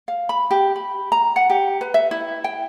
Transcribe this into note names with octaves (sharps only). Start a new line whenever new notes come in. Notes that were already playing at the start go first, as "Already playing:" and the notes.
F5
B5
G4
B5
A#5
F#5
G4
B4
E5
E4
G5